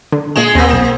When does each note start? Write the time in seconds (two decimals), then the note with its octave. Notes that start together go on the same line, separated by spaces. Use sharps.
0.12 D3
0.36 A#2 G#3 G#4 E7
0.55 D#2 A#3 C4
0.70 B1 E7